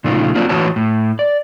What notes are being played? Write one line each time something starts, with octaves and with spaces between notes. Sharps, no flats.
A#2 C#3 F3 A3 D#4 F4
F#3 A#3 C4 D4 F4
A2 E3 F#4 B4 C#5 A5
A2
D5